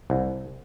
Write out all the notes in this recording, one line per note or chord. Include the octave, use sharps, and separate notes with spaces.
C2